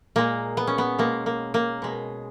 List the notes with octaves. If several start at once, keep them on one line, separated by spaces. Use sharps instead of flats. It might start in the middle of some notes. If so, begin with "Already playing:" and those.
A#2 G#3 A#3
B3
C#4
B3
B2 G#3 A#3
A#3
A#3
B2 G#3